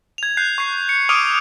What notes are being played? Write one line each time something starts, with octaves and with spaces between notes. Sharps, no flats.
G#6 F7
F#6 G6 C7
C#6 C7
C#7
D6 D#6 F6 D7 D#7 F7